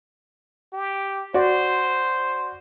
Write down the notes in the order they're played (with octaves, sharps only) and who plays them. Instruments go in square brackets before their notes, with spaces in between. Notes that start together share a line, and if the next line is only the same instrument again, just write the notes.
[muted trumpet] G4
[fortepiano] F#4 D5 [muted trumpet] C5